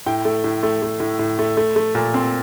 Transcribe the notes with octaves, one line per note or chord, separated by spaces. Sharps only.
A2 G5
A3
A2
A3
A3
A2
A2
A3
A3
A3
A#2
C4